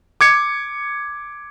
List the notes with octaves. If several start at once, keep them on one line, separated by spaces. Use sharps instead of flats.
D6 G#6 C#7